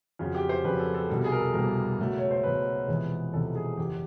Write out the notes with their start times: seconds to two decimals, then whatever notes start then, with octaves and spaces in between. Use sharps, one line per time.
0.19 F2 C#3 F#3 F4
0.35 G4
0.49 C5
0.64 F2 C#3 F#3 B4
0.79 A4
0.94 A4
1.09 C2 B2 G3 A#3
1.24 G#4
1.32 A#4
1.39 A4
1.54 C2 B2 G3 A#3 A#4
1.99 C#2 B2 F#3 A3
2.18 C#5
2.31 C5
2.43 C#2 B2 F#3 A3 B4
2.88 E1 E2 C3 F3 G#3
3.33 E1 E2 C3 F3 G#3 A4
3.55 G#4
3.78 F#1 E2 C#3 G4